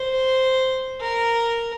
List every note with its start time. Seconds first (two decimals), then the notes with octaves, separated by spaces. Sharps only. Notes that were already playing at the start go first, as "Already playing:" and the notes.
Already playing: C5
1.01 A#4